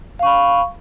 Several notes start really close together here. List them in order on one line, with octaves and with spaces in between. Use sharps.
F5 C#6 B5